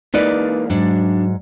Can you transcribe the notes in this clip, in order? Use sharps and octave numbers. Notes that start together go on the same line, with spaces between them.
E3 G#3 A#3 D#4 B4 D5
G#2 F#3 D4